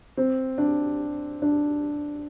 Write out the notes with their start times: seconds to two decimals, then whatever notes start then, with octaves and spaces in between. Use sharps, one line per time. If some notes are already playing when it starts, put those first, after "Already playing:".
0.17 C4
0.58 D4
1.42 D4